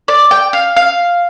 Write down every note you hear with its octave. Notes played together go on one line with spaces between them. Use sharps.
D5
G5
F5
F5